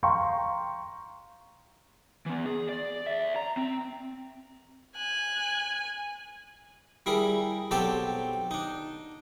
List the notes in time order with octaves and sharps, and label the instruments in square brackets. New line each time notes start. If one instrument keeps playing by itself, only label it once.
[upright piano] F5 G5 A#5 C6 C#6
[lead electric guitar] E3 B3
G#4
D5
D5 E5
A#5
C4
[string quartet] G#5 [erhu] F#6
[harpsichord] G3 E4 G#4 A#4
B1 F#3 C4 G4 A4 A5
D4 D#4